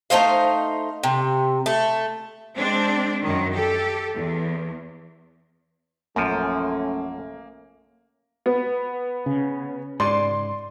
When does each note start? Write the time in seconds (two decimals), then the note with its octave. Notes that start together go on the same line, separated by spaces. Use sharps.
0.10 A3 D#4 C5 F5
1.03 C3
1.66 A3
2.57 G#3 C4 D4
3.23 F#2 D#3
3.54 G4 A4
4.15 E2
6.16 A#1 F#2 F3 A3 A#3 C#4
8.46 B3
9.26 C#3
10.00 G#2 D5 C6